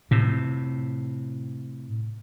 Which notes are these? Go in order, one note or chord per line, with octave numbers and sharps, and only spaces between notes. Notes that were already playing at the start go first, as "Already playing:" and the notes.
A2 C3